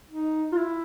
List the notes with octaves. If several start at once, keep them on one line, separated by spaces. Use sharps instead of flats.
D#4
F4
E4